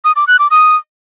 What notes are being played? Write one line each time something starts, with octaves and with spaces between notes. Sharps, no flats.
D#6
D6
F#6
D6
D#6